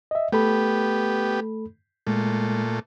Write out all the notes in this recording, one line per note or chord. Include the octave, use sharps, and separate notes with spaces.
D#5 E5
A3 B3 G4 A4 B5
A#2 G#3 A3